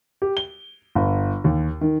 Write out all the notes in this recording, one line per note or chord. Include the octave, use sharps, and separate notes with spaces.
G4
G7
G1
D#2
D#3